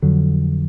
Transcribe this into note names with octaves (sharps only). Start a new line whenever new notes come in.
F2 D3 F#3